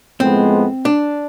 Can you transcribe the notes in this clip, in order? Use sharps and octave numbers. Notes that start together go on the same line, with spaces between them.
A2 F3 G#3 B3 C4
D4